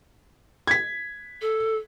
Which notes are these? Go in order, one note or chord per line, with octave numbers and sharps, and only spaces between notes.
G#6 B6
A4